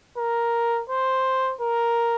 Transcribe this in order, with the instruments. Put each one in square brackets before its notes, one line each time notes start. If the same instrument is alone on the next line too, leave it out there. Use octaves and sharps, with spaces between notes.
[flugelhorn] A#4
C5
A#4